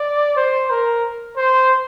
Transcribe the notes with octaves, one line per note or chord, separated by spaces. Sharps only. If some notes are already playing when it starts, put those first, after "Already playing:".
Already playing: D5
C5
A#4
C5